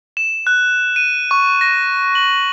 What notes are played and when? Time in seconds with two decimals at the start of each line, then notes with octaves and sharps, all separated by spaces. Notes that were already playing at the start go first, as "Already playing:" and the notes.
0.17 E7
0.47 F#6
0.96 D#7
1.31 C#6
1.61 A#6
2.15 F#7